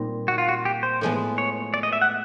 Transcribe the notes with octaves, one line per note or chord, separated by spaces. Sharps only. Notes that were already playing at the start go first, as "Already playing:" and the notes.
Already playing: A#2 G3 C4 D#4
F#4
F4
F#4
G4
C5
A2 F3 G#3 B3
C#5
D5
D#5
E5
F#5